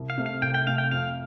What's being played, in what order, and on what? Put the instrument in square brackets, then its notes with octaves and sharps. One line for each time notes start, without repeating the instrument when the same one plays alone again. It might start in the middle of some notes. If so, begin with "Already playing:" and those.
Already playing: [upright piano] C2
[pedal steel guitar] F5
[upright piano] C3 A3
[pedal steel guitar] F5
[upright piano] C2 [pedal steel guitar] G5
[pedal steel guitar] G5
[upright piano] C3 A3 [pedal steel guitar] F5
[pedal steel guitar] G5
[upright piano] F2 [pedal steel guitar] F5